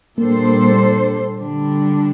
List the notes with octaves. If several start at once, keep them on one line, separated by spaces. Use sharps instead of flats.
A#2 G3 A#3 D4 A4 C5
D3 G3 D4